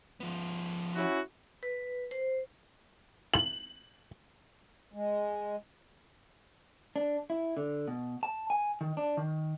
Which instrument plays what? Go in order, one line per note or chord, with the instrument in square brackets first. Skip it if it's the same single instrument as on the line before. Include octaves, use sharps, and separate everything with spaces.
[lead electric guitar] F3 B3
[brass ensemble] C#4 E4 F#4
[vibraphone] B4
C5
[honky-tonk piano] F#7
[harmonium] G#3
[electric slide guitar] D4
E4
D3
B2
A5
G#5
D#3
D4
D#3